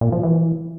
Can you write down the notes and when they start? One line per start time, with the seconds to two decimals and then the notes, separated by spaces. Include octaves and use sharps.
0.01 A#2
0.12 F3
0.23 E3